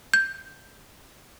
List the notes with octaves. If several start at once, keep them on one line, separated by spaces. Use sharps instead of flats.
G6